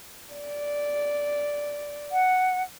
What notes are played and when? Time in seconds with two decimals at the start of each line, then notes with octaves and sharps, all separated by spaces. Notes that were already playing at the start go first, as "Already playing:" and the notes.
0.34 D5
2.12 F#5